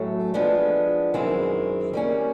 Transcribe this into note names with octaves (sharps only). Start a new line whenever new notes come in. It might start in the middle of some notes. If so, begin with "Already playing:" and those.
Already playing: A2 F#3 A3 C#4
F3 G#3 B3 D4
F#2 D#3 G#3 C4 E4
G3 A#3 C#4